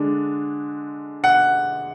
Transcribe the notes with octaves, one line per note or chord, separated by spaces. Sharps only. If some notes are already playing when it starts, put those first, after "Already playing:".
Already playing: D3 G#3 D4
F#5